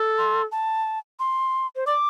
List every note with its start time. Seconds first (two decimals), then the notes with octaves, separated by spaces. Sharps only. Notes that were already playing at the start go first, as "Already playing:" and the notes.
Already playing: A4
0.18 C6
0.52 A5
1.20 C6
1.76 C5
1.87 D5 D6